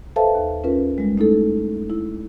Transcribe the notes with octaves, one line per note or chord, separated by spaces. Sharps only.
A4 B4 C5 E5 F5 A5
D#2
C#4 F4 A#4 B4
G3 G#3
A3 D#4 E4 A4
E4